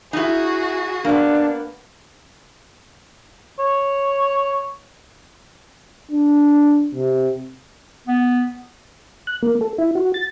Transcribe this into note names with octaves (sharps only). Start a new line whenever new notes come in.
D#4 E4 F#4 G#4
A#3 B3 D4
C#5
D4
C3
B3
F#6
A#3
A4
E4
F#4
A6